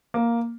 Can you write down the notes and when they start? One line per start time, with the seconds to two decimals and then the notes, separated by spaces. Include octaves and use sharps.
0.14 A#3